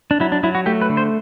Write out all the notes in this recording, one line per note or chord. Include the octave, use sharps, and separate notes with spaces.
D4
F#3 E4
D4
F#3 E4
F#4
A3 G4
B4
D3
C5